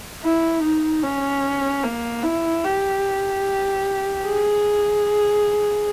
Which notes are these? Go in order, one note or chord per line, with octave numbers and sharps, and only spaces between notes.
E4
D#4
C#4
A#3
E4
G4
G#4